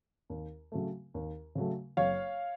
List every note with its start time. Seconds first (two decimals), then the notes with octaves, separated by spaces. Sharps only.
0.30 D#2
0.72 C#3 F#3 A3
1.14 D#2
1.55 C#3 F#3 A3
1.97 F#1 C#5 F5